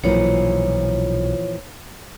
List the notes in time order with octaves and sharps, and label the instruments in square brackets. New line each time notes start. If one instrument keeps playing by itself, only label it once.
[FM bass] B1 [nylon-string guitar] A#2 E3 F3 [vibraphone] C#5